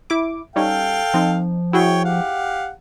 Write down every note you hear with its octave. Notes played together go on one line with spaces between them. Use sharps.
E4 D6
G3 C#4 D#4 A4 F5 G5
F3 C4 D#4
E4 F#4 G#4 C#5 G5
G4 F5 F#5